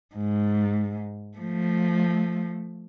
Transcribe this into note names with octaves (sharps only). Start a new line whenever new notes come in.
G#2
F3 A3